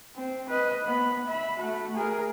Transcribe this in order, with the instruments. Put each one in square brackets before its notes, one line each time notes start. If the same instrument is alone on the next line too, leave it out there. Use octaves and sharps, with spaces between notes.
[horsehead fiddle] C4
B4 D#5
B3 B5
E5 B5
A3 F#4
G#4 A#4